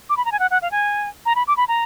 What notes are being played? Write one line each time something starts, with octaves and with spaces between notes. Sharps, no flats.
D6
B5
A#5
G#5
F#5
F#5
F5
G#5
A#5
B5
D6
B5
A#5